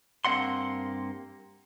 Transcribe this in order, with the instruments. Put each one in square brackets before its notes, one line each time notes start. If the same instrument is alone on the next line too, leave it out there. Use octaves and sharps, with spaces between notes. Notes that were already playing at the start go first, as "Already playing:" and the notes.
[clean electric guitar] G2 A#3 C4 D#5 F#5 C6